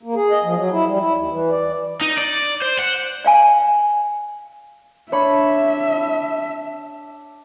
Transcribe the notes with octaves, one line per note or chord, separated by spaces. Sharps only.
A#3
G#4
D#5
F3
F#3
E4
G3
E4
D#2
E3
D5
D#4
D5
C5
F#5
D5 F5 G#5
D4 C#5 E5 B5